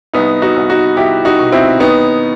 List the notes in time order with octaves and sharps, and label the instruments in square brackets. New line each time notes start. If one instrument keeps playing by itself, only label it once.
[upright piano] C2 B3 D#4
D#4 F#4
C2
D#4 F#4
C2 E4 G4
D#4 F#4
B2
C4 E4
D#2 B3 D#4